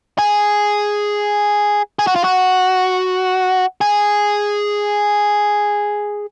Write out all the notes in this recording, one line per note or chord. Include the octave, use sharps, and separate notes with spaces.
G#4
G#4
F#4
F4
F#4
G#4